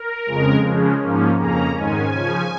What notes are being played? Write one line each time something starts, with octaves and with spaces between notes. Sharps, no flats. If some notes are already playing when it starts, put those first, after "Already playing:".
Already playing: A#4
F2 C#3 G#3
C#3 F3 G#3 C#4
G#2 F3 A#3 C#4
F2 C#3 A#3 C#4 A#5
G#2 D#3 G#3 C#4 G#5
C#3 F3 C#4